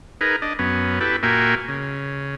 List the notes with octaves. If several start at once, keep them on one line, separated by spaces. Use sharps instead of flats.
D#4 G#4 A#4 B4
D4 D#5
F#2 B3 C#4
E4 G4 A4 B4
A#2 A#3 F#4 E5 G5 G#5
C#3